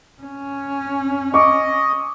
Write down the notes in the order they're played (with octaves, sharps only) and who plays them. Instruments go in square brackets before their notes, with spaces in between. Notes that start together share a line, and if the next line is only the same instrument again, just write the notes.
[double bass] C#4
[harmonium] D#5 [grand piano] C#6 D6